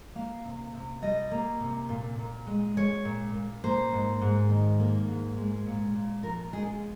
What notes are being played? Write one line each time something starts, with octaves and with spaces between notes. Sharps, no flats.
A#3 F5
C3
C3
G3 D#5
A#3
C3
A#2
A#2
G#3
G#3 C#5
A#2
A#2
A#3 C5
G#2
G#2
D#3
A#3
G#2
G#3
A#2
A#2
F3 A#4
G#3 G#4